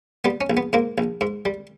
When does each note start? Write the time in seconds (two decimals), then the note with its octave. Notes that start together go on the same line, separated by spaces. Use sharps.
0.25 G3 B3
0.41 C#4
0.50 A#1
0.57 B3
0.73 G#2 A#3
0.98 A#1
1.21 G#2
1.45 G3